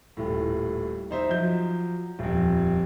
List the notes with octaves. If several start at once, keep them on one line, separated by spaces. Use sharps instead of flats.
D#1 A2
D#4 C5 E5
F3 F#3 G6
D#1 F2